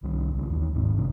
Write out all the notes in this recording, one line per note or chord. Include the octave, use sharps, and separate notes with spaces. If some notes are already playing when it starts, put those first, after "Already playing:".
C2 D#3 G3
B1 C#3
D#2 E3
G1 G#2
G1 E2 C3 D4